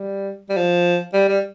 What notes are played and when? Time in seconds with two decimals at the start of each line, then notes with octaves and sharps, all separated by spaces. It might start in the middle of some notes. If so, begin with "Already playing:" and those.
Already playing: G3
0.49 G3
0.57 F3
1.14 G3
1.29 G3